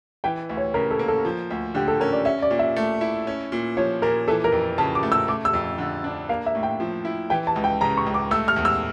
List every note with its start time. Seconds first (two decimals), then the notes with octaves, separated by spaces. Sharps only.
0.24 E3 G5
0.49 D2
0.57 C#5
0.74 C#3 A#4
0.91 A4
0.99 A#3
1.08 A4
1.25 F3
1.50 D2
1.74 D3 G4
1.88 A4
2.00 C#4 A#4
2.13 D5
2.25 C#4 E5
2.42 D5
2.51 A#2
2.59 E5
2.76 A3
3.01 E4
3.27 C#4
3.52 A#2
3.77 F3 C#5
4.02 A#2 A#4
4.28 E3 A4
4.44 A#4
4.52 F2
4.78 C#3 A5
4.95 D6
5.03 A3
5.12 E6
5.28 A3 D6
5.45 E6
5.53 F2
5.78 D3
6.04 D4
6.29 A#3 F5
6.46 E5
6.55 A2
6.63 G5
6.80 F3
7.05 E4
7.30 E3 G5
7.47 A5
7.56 C#2
7.64 G5
7.81 C#3 A#5
7.97 C#6
8.06 C#2
8.14 D6
8.31 A3 E6
8.48 F6
8.56 E2
8.65 E6